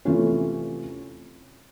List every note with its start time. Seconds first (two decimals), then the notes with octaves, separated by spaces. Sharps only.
0.05 C3 E3 A3 C#4 F4